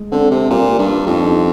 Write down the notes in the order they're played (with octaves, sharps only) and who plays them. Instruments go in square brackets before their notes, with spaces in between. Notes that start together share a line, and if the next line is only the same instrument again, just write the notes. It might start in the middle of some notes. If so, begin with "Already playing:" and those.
Already playing: [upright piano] G#3
[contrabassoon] D3 [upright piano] C4
[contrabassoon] C3 [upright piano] C4
[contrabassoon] A#2 [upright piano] G3
[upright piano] A#3
[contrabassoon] G2
[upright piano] G3
[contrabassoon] F2 [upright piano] D#4
[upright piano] D#4